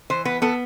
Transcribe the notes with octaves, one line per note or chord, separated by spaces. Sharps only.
E3 C5
B3 B4
B3 A4